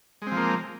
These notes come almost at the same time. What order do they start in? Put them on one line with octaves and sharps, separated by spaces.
G#3 C4 F3 A#3